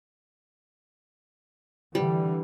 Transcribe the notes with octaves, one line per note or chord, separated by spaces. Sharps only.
D3 E3 G3